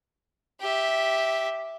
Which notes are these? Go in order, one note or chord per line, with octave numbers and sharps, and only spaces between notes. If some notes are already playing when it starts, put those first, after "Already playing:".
G4 E5